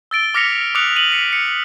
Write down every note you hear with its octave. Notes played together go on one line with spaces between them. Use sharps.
E6 A6 D7 G7
D6 F6 A#6 B6 C#7 F7
D6 D#6 F6 F#6 C#7 F7
D#7 F7 F#7
B6 C#7
C#7